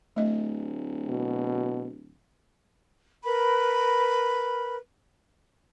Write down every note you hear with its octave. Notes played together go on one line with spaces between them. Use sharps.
D1 A3 D#5
B2
A#4 B4 B5